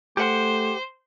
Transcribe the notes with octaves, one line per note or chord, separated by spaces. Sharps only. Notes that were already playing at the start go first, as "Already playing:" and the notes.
A3 G4 C5 F#5